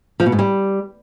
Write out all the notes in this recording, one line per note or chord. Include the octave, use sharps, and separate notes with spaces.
F3
B2
G#2
G3